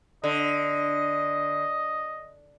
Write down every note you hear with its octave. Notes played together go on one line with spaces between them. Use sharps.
D3 D#5